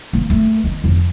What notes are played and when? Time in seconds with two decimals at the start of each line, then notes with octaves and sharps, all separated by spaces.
0.13 A#3
0.30 A3
0.64 D#3
0.84 F2